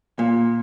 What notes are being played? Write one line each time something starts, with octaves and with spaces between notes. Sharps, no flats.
A#2